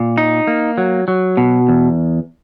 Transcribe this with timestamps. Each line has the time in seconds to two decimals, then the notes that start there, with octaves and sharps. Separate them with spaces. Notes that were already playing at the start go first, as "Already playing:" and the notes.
Already playing: A#2
0.18 D#4
0.47 A#3
0.78 F#3
1.08 F#3
1.37 B2
1.69 E2